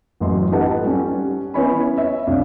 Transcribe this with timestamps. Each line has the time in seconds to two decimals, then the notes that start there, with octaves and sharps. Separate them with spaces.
0.20 A1 F#2 F#4 C6
0.51 D#4 G4 A4 B4 F#5 A5
0.84 G3 C#4
1.54 B3 C#4 E4 C#5 G#5 B5
1.98 C#5 E5
2.27 C2 D4 F5